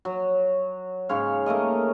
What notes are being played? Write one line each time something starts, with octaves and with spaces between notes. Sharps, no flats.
F#3
G#2 C#3 C#5 F5
A3 A#3 A#4 D#5